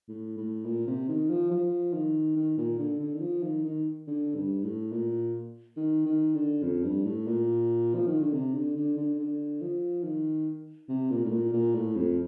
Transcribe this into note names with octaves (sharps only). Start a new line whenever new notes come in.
A2
A2
A#2
C3
D#3
F3
F3
D#3
D#3
A#2
D3
D3
D#3
F3
D#3
D#3
D3
G2
A2
A#2
D#3
D#3
D3
F2
G2
A2
A#2
F3
D#3
D3
C3
D3
D3
D3
D3
F3
D#3
C3
A#2
A2
A#2
A#2
A2
F2